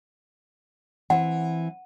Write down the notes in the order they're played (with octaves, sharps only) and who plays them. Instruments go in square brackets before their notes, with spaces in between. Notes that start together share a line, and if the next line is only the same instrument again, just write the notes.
[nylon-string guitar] E3 C4 [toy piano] F#5